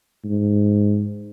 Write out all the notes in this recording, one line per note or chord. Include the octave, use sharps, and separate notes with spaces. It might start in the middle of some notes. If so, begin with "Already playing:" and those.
G#2